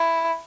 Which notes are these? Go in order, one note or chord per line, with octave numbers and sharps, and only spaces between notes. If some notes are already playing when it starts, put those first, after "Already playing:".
Already playing: E4